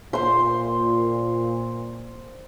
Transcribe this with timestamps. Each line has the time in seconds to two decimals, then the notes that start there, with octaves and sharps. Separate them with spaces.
0.13 A#2 C5 C6